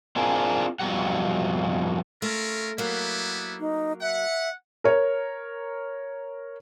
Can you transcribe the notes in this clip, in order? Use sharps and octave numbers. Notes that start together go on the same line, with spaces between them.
C4 D4 F4 G#4 A#4
F2 B2 F#3 G3 F#5
A3 C#4 F4 A#4
F#3 G3 A#3 B3 E4
D#4
E5 F#5
A#4 C#5